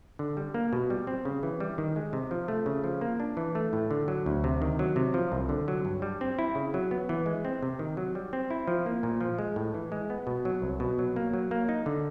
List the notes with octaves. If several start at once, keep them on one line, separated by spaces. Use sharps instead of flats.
D3
G3
A#3
B2
G3
C4
C#3
E3
G3
D#3
G#3
C3
F3
A3
C#3
F3
A#3
D4
E3
A3
A2
D3
F#3
D2
C3
D#3
F#3
C3
F3
C2
D3
F#3
G2
G3
C4
E4
C#3
F#3
B3
E3
G#3
C4
C3
D#3
F#3
G3
C4
E4
F3
A#3
A#2
F3
G#3
A2
E3
G#3
B3
B2
F#3
C2
B2
F#3
A#3
F#3
A#3
D#4
D3